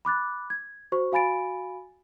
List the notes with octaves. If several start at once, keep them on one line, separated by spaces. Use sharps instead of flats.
B5 D6 F#6 A6
G#6
F#4 C5 C#6
F#4 F5 G#5 B5 A6 D7